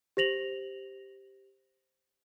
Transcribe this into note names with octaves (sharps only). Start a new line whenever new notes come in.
G4 C5 A#6 F7 F#7